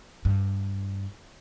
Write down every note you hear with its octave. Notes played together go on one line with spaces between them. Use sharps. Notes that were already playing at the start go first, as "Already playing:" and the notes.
G2